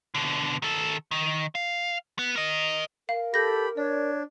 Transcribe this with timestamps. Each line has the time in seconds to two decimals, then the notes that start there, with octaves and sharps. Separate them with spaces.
0.15 B2 D3
0.62 D#3 A4
1.11 D#3
1.55 F5
2.19 B3
2.36 A#4 D#5
3.09 A#4 F5
3.34 G4 A4 B5 G6 A#6
3.77 D4 C#5 D5